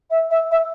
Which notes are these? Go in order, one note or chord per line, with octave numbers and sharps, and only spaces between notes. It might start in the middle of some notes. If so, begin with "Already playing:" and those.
E5
E5
E5